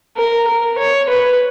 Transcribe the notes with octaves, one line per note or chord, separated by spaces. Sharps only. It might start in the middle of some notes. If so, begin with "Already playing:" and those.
A#4
A#4
C#5
B4